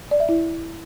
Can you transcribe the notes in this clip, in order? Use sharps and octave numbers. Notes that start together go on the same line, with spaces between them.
D5
E5
E4